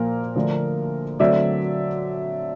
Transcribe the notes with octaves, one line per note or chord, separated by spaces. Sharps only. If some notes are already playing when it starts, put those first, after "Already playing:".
Already playing: A#2 F3 A#3 A#4
D3 F3 A3 D4
D3 F#3 A3 C4 D5 E5